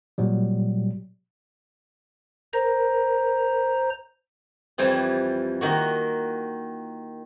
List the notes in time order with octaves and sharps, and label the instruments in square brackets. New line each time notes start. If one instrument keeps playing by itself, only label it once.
[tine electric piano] A#2 F#3 G3
[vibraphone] A#4 [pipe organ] C5 A#5
[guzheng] F2 E3 F3 G3
D#3 A#3 F#4